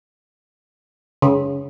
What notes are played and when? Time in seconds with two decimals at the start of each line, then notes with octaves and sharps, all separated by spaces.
1.22 C#3